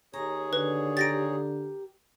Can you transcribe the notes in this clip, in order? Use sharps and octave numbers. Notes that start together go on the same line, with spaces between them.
D#2 G#4 C#5 A#5
D3 B4
G4 A#4 A6 A#6 D7